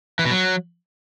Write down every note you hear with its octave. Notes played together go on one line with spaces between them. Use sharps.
E3
B2
F#3